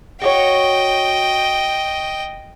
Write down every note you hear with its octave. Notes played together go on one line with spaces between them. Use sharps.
F#4 G4 C#5 D#5 G5